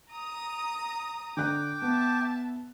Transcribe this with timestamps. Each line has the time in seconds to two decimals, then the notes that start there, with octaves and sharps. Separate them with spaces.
0.11 A#5 D#6
1.37 D3 G5 D6 F#6
1.82 B3 E5 A5